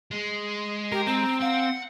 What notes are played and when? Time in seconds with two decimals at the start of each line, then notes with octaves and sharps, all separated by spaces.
0.11 G#3
0.92 G4 A#4
1.07 C4 A#5
1.41 F5 F#5